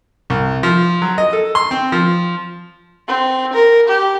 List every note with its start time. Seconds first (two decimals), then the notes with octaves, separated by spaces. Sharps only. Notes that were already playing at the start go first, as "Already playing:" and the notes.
0.30 C2
0.63 F3
1.02 F#3
1.18 D#5
1.33 A4
1.55 C6
1.71 C4
1.92 F3
3.08 C4
3.53 A#4
3.88 G4